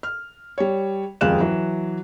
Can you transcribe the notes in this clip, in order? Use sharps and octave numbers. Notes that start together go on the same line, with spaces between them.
F6
G3 C#5
D#1 F2 G#3 F5 F#6 E7
E3 F#3